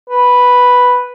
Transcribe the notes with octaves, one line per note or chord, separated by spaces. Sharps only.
B4